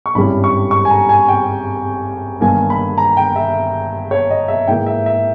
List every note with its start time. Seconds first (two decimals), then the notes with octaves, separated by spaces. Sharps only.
0.06 C#6
0.15 G#1 G2 G3 C#4 E4 B5
0.44 C#6
0.71 C#6
0.85 G#5
0.91 A#5
1.09 G#5
1.28 G5
2.41 G1 G2 D#3 A#3 G#5
2.70 B5
2.98 A#5
3.17 G5
3.36 E5
4.11 C#5
4.31 D#5
4.48 E5
4.68 G#2 E3 A#3 G5
4.86 E5
5.06 E5